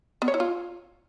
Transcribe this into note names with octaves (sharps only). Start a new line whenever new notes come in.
B3
C#5
E4
F4